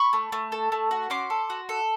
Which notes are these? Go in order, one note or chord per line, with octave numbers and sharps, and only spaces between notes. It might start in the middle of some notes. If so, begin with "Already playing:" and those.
Already playing: B5 C#6
A3
A3
A4
A3
F#4
C#4 C6 D6
A4
F#4
A4